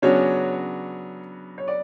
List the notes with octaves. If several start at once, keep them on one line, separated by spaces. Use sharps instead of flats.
C#3 F#3 B3 C#4 D4 F#4 C#5
C#5
D5